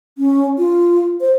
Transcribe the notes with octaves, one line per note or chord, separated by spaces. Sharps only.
C#4
F4
C5